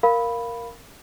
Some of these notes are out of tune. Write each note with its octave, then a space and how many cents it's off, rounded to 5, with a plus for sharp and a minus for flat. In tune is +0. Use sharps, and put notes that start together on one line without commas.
A#4 +0 F5 +0 B5 +0